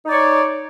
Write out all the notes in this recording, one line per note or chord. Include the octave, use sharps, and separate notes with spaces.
D#4 C#5 D5